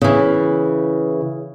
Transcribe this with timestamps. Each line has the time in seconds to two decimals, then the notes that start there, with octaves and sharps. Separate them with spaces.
0.02 C#3 E3